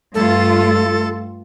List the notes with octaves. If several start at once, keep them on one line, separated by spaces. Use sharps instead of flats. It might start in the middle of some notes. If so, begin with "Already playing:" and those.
G2 A3 F4 A4